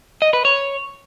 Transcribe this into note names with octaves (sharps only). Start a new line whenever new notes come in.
D#5
B4
C#5